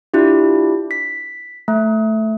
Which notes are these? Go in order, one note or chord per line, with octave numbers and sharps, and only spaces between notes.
D4 E4 F4 G4
B6
A3